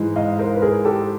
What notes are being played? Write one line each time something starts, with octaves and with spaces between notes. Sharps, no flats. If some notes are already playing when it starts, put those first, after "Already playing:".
Already playing: G#2 E3 G#3
D#5 F5
A#4 C5
B4
G#4 A#4
G4 A4